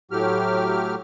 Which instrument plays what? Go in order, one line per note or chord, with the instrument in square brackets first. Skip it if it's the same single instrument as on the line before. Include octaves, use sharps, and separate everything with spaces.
[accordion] A2 F#3 G4 F6